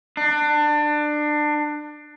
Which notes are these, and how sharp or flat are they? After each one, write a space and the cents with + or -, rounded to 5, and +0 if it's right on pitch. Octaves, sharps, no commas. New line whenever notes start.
D4 +25